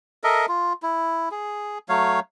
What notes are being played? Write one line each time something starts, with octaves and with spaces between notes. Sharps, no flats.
A4 A#4 D#5 E5
F4
E4
G#4
F#3 A3 C#5 F5